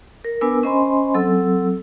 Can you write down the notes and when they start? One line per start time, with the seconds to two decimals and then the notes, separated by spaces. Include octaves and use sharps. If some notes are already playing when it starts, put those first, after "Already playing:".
0.24 A#4
0.41 B3 D4 A#4 B4 G#5 E6
0.63 C#4 C5 D#5 G#5 B5 C6
1.14 F#3 C4 A4 E6